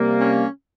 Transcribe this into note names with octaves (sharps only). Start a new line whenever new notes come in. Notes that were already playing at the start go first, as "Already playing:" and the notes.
Already playing: C3 G3 A#3
C#4